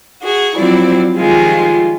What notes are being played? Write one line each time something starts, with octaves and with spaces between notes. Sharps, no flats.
F#4 G#4
F3 F#3 C4 E4 D5
D#3 F3 G3 G#3 F4